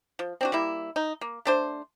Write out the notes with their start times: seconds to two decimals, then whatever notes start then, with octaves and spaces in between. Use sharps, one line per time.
0.19 F3
0.41 C4 D4 F#4
0.52 G3 A#3 E4
0.96 D#4
1.21 A#3
1.45 A3 D4 C5